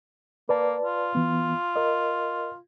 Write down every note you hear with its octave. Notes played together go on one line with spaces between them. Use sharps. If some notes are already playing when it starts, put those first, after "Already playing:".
A#3 B4 D5 A5
F4
E3 B3
A#4 D#5